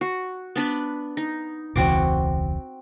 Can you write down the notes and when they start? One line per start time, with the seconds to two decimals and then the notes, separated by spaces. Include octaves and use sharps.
0.01 F#4
0.56 B3 D4 B4
1.17 D#4
1.76 E1 C#2 E3 C4 F#4 D6